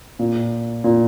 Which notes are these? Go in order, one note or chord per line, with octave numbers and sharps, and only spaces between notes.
A#2
A#2